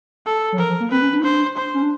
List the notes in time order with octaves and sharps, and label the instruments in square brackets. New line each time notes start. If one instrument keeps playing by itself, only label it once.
[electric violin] A4
[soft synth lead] F#3
[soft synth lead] F3 [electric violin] A#4
[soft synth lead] F3
A#3
[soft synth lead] C4 [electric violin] B4
[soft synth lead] C#4
D4
D#4
[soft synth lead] D4 [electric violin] C5
[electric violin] C5
[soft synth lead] C#4
D4